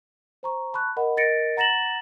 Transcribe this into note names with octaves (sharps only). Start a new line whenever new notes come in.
C5 A#5 C#6
A5 B5 C#6 F#6
A#4 D#5 F#5 B5
A#4 D#5 A6 A#6 C#7 D7
F#5 A#5 A6 A#6 E7 F#7